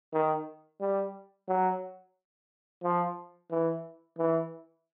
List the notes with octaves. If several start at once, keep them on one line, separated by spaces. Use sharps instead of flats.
D#3
G3
F#3
F3
E3
E3